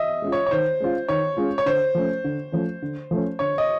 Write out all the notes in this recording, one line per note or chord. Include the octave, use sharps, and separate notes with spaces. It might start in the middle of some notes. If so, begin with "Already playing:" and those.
Already playing: D#5 E5
G#3 C#4 F4
C#5
C#5
D#3 C5
G#3 C#4 F4
D#3 C#5
G#3 C#4 F4
C#5
D3 C5
F3 A3 C#4
D3
F3 A3 C#4
D3
F3 A3 C#4
D3 C#5
D#5